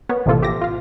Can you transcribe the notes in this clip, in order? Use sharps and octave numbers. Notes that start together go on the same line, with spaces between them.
B3 A#4 C#5
A1 C3 F3 A#3 F4 A4
G4 E5 D6 A#6
F4 F5